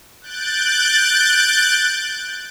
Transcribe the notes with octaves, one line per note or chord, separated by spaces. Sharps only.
F#6 G6 A6 D7